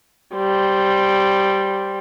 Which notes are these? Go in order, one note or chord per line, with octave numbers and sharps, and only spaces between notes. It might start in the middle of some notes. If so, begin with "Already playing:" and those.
G3 C5